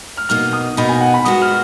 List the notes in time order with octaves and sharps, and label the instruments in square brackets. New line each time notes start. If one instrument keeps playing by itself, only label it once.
[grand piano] F6
[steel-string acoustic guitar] B2 A#3 D#4 [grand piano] F6
[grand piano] D#6
[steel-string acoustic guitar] B2 A#3 D#4 [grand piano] B5
[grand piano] G#5
F#5
B5
[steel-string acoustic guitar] A#2 G#3 B3 F#4 [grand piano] D#6
[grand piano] F6